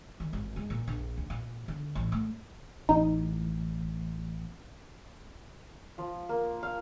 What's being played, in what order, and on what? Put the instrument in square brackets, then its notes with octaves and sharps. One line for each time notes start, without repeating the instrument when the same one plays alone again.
[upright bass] D#3
G#1
G#3
A#2
A#1
D2
A#2
D3
A1
A3
[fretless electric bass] A1 [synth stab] D#4
[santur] F3
A#3
F5